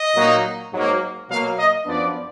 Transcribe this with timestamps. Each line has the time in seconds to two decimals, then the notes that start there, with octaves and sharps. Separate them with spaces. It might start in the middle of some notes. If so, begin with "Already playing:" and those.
Already playing: D#5
0.14 A#2 F#3 A#3 D#4
0.72 G#2 F#3 A#3
1.28 B2 F#3 A#3 F5
1.58 D#5
1.85 F#2 F3 B3 D4 D5